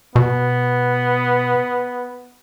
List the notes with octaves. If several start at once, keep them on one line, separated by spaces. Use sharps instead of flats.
B2 B3